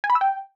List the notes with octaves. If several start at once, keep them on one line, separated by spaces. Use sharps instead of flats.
G#5
B5
E6
G5